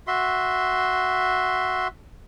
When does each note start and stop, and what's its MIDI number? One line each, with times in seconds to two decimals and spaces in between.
0.07 1.88 66
0.07 1.88 76
0.07 1.88 84